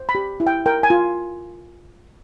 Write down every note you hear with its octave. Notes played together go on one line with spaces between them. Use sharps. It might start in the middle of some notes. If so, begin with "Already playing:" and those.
Already playing: C5
B5
G4
E4
G5
A#4 G5
G#5
F4